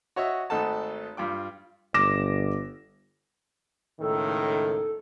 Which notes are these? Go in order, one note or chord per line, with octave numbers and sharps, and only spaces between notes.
F#4 C#5 D#5 E5
G#1 A3 D#4 A4 F#5 A5
G2 F4 G5 D6
G1 D6 A#6 E7
C#2 A2 D#3 A4